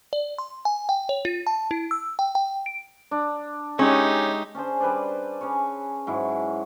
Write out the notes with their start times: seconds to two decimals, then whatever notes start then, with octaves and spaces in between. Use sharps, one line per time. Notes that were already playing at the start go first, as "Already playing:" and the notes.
0.13 D5
0.38 C6
0.65 G#5
0.89 G5
1.09 C#5
1.25 F4
1.47 A5
1.71 E4
1.91 E6
2.19 G5
2.35 G5
2.66 D7
3.11 D4
3.79 G#3 C#4 D#4 G4 C#5 E5
4.54 C#4 D4 G#4 C5
4.80 G3 B4 C5 D5
5.41 C#4 G#4 C#5
6.07 G#2 F#3 E4